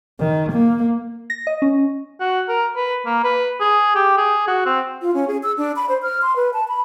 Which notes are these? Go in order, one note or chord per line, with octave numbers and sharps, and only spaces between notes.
D#3
A#3
A#6
D#5
C#4
F#4
A#4
B4
A#3
B4
G#4
G4
G#4
F#4
C4
F4
C#4
G#4
E6
D4
B5
C5
F6
C6
B4
A5
B5